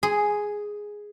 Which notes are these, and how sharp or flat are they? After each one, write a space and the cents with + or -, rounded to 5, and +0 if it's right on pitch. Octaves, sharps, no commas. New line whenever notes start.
G#4 +0 C6 -15